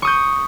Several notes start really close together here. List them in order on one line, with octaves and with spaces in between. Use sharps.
C#6 D#6 G6